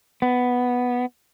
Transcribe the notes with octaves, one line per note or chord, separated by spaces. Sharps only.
B3